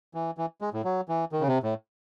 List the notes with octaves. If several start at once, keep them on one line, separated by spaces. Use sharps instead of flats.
E3
E3
G#3
A2
F#3
E3
D#3
C#3
C3
A2